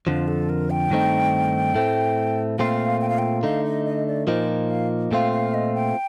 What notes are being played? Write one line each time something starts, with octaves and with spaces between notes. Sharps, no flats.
F2 D3 F3 F4
A4
A#4
G5
G2 D#3 A3 C4 D#4
A2 A3 C4
A#2 A3 C4 F4 F5
G5
F5
G5
D3 A3 D#4 F5
D#5
D#5
D5
A#2 F3 A#3 D#4 C5
F5
A#2 A3 C4 F4 F5
F5
D#5
G5